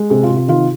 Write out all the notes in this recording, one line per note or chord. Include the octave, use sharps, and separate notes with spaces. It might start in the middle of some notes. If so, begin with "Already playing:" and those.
Already playing: G#3
C3 G#4
F4
C3
F4
D#3 F4